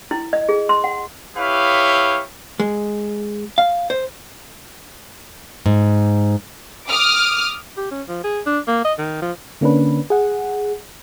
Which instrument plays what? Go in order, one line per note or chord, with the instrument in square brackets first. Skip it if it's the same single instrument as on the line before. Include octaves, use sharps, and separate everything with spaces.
[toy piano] E4
D#5
G#4
C6
F#5
[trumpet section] E4 G4 B4 C#5 F5
[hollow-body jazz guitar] G#3
F5
C5
[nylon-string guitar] G#2
[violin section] D6 D#6 F6
[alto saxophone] G4
C#4
F3
G#4
D4
A#3
D#5
D#3
F3
[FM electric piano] D3 A#3 C#4 D4 B4
G#4 F#5